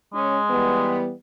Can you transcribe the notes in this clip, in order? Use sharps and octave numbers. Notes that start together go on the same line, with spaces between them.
G#3 C#4
E3 G3 B3